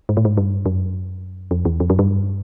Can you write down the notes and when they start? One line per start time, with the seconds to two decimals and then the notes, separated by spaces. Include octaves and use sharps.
0.09 G#2
0.17 A2
0.25 G#2
0.37 G2
0.66 F#2
1.51 F2
1.65 E2
1.80 F2
1.90 F#2
1.99 G2